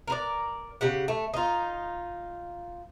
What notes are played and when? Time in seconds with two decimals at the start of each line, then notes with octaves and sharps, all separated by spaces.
0.08 A#4 B4 D5
0.81 C#3 G4 F#5
1.08 A3
1.34 D#4 F4